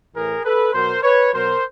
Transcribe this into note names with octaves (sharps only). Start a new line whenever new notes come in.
A2 E3 G#4 A#4
A4 B4
B2 F#3 A#4 C5
B4 C#5
B2 F#3 A#4 C5